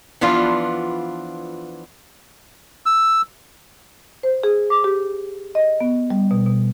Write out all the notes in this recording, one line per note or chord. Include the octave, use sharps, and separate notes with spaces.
E3 F3 B3 D4 F4
E6
C5
G#4
D6
G4
D#5
B3
G3
B2
B2